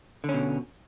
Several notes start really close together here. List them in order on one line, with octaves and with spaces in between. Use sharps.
D3 C#4 B2